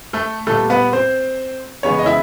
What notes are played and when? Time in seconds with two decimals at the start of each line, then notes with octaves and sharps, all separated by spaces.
0.13 A3 A4
0.47 A#2 G3 A3 B3 A4
0.70 B3 B4
0.93 C4 C5
1.83 C#3 E3 G#3 B3 C#4 C#5
1.99 D#5
2.06 E4 E5